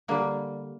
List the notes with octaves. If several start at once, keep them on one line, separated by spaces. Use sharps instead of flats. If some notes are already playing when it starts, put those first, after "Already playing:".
D3 G3 A#3